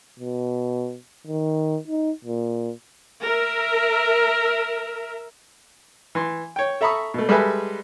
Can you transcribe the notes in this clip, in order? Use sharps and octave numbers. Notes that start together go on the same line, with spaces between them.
B2
D#3
D#4
A#2
A#4 E5
E3 C6
C#5 G5
A4 E5 A#5 B5 C#6 D#6
B2 A3
G3 G#3 G#4 A4 B4 E5